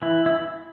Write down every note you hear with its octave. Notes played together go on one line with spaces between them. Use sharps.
E3 E4
E4